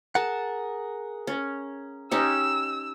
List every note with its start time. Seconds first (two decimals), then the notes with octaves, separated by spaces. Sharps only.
0.15 G#4 A#4 F#5 A5
1.27 C#4
2.11 C#4 D#4 G4 E6